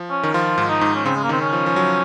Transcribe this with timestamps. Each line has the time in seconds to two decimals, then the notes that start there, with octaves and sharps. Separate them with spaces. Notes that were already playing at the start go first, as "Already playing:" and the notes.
Already playing: F3
0.10 C#4
0.23 D#3
0.34 F3 F4
0.58 G#2
0.69 D#4
0.81 G#2
0.95 C#4
1.05 C#3 C4
1.16 G#3
1.24 A#3
1.29 D#3 C4
1.41 C#4
1.53 F3
1.66 F3
1.76 F#3